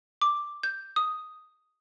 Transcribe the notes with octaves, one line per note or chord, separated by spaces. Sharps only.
D6
G6
D#6